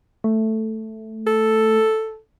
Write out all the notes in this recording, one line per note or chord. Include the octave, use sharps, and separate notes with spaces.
A3
A4